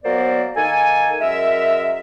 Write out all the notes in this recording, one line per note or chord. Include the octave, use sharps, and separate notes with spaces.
F#3 A#3 B3 A#4 C5 D5
D#3 A#3 A4 G#5
F#2 G#3 A#4 E5